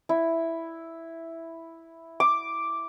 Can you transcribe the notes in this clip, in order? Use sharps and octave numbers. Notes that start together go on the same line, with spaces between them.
E4
D6